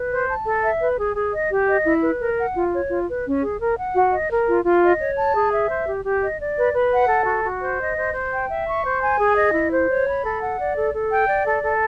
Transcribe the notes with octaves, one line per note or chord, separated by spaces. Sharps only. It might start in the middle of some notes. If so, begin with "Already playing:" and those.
Already playing: B4
C5
A5
A4
E5
B4
G#4
G#4
D#5
G4
D#5
E4
B4
A#4
F#5
F4
C#5
F4
B4
C#4
G#4
A#4
F#5
F#4
D#5
A#4
F4
F4
D#5
C#5
A5
G#4
E5
C5
G4
G4
D#5
D5
B4
B4
F#5
A4
F#4
F#4
C5
D#5
C5
C5
G5
E5
C#6
C5
G#5
G#4
D#5
E4
C5
C#5
B5
A4
F#5
D5
A4
A4
G5
D5
A4
A4